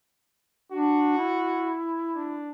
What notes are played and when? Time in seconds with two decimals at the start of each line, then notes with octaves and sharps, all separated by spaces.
0.72 D4 F#4
1.17 E4
2.15 D4